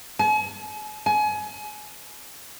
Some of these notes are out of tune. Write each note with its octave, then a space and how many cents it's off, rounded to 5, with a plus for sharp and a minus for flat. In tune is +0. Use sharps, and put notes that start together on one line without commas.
G#5 +45
G#5 +30